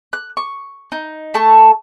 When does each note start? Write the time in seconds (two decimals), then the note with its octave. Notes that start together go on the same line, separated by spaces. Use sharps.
0.13 F#6
0.37 C#6
0.92 D#4
1.34 A3 A5 C#6